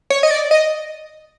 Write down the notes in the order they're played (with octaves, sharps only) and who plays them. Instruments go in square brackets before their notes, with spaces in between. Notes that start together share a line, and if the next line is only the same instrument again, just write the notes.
[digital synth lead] C#5
D#5
D5
D#5